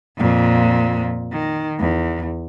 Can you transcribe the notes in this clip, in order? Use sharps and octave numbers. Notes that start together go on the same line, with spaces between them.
F2 A#2
D#3
E2